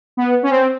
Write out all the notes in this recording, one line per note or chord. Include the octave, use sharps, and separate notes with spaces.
B3
C#4
C4